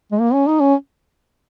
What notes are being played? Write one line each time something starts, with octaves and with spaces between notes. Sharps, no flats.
G#3
A#3
C#4
D#4
C#4